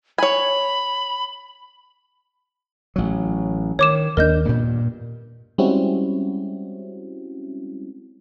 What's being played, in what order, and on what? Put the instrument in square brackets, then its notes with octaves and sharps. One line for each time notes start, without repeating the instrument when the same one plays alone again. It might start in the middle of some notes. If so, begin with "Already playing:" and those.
[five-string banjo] C#5 G#5 [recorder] B5
[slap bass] A1 F#3
[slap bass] D#3 [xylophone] C#5 D6 E7
[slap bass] D#2 A3 D4 [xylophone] A#4 D#5 G6
[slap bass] G2 A#2
[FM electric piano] G3 G#3 C4 C#4 E4 F#4